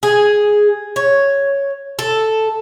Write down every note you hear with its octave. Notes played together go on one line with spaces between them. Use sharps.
G#4
C#5
A4